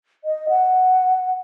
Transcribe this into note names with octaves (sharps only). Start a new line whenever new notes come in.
D#5
F#5